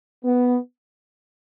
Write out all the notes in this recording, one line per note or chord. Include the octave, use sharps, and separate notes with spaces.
B3